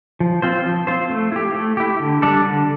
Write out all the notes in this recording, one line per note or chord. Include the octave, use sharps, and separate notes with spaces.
F3
C4 F4 C5
F3
C4 F4 C5
A3
E4 G4
A3
E4 G4
D3
G3 D4 A4 D5
D3